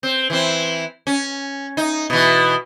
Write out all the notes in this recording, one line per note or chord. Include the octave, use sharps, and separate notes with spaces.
C4
E3 C4
C#4
D#4
B2 E3